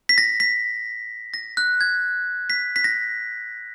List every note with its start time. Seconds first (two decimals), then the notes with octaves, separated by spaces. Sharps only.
0.09 B6
0.18 A#6
0.40 B6
1.34 A#6
1.57 F#6
1.81 G#6
2.50 B6
2.76 B6
2.84 A#6